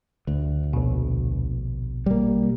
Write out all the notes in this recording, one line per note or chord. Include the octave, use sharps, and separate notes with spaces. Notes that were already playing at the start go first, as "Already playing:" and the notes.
D2 D3
A#1 B2
G3 A#3